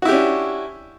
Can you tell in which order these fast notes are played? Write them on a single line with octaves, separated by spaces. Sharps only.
F#4 E4 G4 C#4 D4